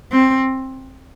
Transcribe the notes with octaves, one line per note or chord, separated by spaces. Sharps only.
C4